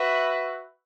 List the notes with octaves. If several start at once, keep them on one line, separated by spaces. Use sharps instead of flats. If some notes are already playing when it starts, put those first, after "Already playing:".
Already playing: F#4 B4 E5